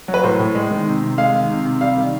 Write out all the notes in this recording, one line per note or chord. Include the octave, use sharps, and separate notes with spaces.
F#3
B4
A2 C5
A2
G#3
D#3
C3
C3
G#3 F5
D#3
C3
C3
G3 F5
D#3